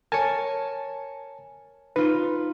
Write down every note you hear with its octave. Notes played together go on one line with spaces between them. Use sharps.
A#4 C#5 G#5 A5
D#4 F4 B4